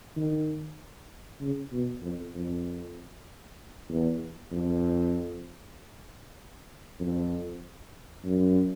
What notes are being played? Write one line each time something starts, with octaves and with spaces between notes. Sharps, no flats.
D#3
C#3
B2
F2
F2
E2
F2
F2
F#2